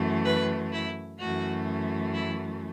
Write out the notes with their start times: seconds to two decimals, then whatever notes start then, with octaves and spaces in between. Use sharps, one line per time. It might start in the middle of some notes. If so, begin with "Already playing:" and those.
Already playing: F#2 E3 A3
0.25 B4
0.72 E4
1.19 F#2 E3 A3 F#4
2.14 E4